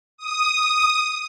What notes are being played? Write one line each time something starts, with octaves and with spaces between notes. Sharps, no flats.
D#6